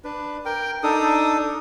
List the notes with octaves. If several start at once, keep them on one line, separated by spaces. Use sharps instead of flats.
D4 B4
A#4 G5
D4 D#4 A4 D#6